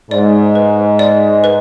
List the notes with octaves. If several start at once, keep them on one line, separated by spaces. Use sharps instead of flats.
G#2 D5
B4
D5
B4